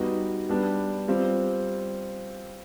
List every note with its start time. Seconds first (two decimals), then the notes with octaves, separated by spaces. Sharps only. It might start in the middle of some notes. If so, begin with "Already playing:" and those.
Already playing: G3 B3 D#4 F#4
0.49 G3 B3 D4
1.08 G3 C4 F4